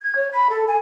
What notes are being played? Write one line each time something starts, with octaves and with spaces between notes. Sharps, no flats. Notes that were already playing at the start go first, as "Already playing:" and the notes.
G#6
C#5
B5
A4
G#5